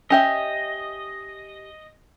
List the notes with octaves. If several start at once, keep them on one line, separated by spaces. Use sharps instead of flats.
C#4 G4 D#5 E5